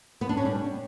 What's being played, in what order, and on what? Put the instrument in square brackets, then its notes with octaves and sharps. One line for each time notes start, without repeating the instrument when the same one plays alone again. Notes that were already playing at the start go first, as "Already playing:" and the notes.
[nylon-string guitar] B3
D4
C#4
G3